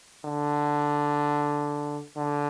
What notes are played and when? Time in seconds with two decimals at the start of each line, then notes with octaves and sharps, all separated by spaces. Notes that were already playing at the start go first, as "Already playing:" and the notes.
0.25 D3
2.17 D3